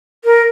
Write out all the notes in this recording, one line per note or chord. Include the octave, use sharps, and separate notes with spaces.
A#4